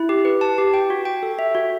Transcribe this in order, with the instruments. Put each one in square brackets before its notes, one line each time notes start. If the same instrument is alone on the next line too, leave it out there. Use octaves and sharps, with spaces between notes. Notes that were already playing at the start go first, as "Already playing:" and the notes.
Already playing: [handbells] E4
G4
B4
A5
G4
G5
F#4
G5
A4
E5
F#4